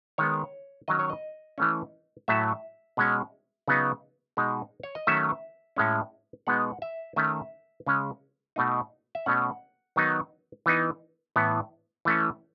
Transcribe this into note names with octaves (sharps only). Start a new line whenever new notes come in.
D#3 G#3 B3 C#5
D#3 F#3 C#4 D#5
C#5
D#5
E3 A3 C#4
A2 F#3 A3 E5
B2 G#3 C#4
C#3 F#3 B3 D#4
B2 G#3 D#4
C#5
D#5
D#3 F#3 A3 C#4 E5
A2 G#3 C#4
B2 G#3 B3 D#4 F#5
E5
D#3 A3 C#4 E5
C#3 G#3 C#4
B2 A3 D#4
E5
B2 A3 C#4 F#5
D#3 F#3 B3 D#4
E3 B3 D#4
A2 E3 B3
E3 A3 C#4